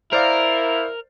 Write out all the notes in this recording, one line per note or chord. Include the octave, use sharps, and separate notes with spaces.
E4 A#4 C5 D5 F5